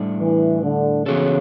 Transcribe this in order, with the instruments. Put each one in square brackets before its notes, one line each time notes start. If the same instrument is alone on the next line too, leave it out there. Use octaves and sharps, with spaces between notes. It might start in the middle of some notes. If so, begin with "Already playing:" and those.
Already playing: [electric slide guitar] A2 G3 D4 A4
[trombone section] E3
D3
[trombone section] C#3 [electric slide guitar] E3 B3 F#4 A4